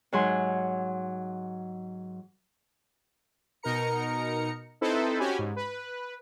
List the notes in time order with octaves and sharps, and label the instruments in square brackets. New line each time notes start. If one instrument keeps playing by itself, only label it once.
[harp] G#2 F#3 G#5 C6
[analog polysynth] B2 D#4 A#4 A#5 C#7
C4 D#4 E4 A4 B4 C5
C#4 F#4 G4 G#5 B5
G#2
B4